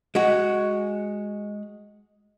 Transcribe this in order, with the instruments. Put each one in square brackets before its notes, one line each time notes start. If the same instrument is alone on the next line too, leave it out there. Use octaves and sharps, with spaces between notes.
[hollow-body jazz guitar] G#3 F#4